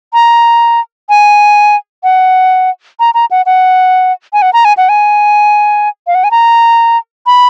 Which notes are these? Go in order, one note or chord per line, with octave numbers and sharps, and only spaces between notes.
A#5
G#5
F#5
A#5
A#5
F#5
F#5
G#5
F#5
A#5
G#5
F#5
G#5
F5
F#5
G#5
A#5
B5